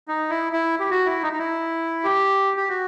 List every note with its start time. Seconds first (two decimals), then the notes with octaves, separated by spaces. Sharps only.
0.08 D#4
0.30 E4
0.53 E4
0.80 G4
0.90 F#4
1.06 E4
1.23 D#4
1.33 D#4
1.38 E4
2.04 G4
2.57 G4
2.69 F#4